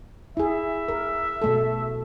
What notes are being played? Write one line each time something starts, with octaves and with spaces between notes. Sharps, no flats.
E4 G#4 E5
A#4
B2 A3 A4